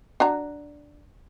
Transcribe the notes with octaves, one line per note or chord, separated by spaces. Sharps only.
D4 F#4 A#5